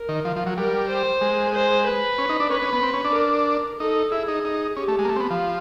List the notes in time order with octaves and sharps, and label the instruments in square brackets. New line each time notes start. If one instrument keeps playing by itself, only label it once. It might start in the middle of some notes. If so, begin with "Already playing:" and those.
Already playing: [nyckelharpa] A#4
[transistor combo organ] D#3
F3
F3
F#3
[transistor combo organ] G3 [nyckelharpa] A#4
[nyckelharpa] C5
[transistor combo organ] G#3
[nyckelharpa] C5
B4
[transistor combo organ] C#4
D#4
D4
[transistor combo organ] C#4 [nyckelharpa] B4
[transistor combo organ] C#4
B3
C4
C#4
D4
[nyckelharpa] A#4
[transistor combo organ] D#4 [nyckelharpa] A4
[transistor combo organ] E4 [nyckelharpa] G#4
[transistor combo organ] D#4
D#4
[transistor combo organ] C#4 [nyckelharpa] G4
[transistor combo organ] A3
G#3
A#3
A3
C4
B3
F3